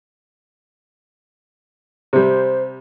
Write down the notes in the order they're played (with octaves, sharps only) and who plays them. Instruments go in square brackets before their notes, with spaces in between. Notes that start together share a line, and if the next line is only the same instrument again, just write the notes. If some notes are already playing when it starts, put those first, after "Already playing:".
[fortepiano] C3 G3 [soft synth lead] C5